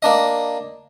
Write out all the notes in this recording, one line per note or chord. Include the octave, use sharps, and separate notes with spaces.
A#3 D4 D#5